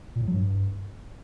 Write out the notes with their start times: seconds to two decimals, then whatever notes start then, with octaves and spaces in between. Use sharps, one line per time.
0.15 A#2
0.21 A2
0.27 F#3
0.33 G2